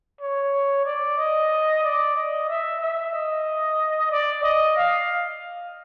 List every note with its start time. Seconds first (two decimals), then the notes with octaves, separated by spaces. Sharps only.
0.21 C#5
0.86 D5
1.18 D#5
1.84 D5
2.16 D#5
2.49 E5
2.81 E5
3.13 D#5
4.12 D5
4.43 D#5
4.77 F5